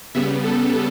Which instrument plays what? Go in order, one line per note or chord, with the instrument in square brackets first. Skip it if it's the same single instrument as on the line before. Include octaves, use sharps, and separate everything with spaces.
[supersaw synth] C#3 G3 B3 E5
A4